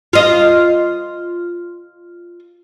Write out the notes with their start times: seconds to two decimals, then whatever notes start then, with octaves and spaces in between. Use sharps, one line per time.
0.13 F4 D#5